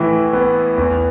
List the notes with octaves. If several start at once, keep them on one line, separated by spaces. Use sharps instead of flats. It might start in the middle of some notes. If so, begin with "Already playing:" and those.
Already playing: A2 E3 E4
B3
E2